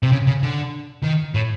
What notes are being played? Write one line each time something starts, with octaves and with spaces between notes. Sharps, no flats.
C3
C#3
C#3
D3
D#3
A2